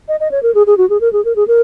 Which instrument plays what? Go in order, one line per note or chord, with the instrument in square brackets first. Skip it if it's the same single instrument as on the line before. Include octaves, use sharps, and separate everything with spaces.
[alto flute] D#5
D#5
C#5
A#4
G#4
G#4
F#4
G#4
A#4
G#4
A#4
G#4
A#4